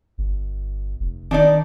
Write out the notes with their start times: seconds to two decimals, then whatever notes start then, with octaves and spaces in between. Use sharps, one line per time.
0.18 G1
1.00 F1
1.31 D#3 D4 D#4 D5